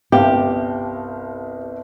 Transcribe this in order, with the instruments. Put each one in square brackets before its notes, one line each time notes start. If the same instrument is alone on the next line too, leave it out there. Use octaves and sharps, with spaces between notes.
[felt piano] G1 C2 F5 [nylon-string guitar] G4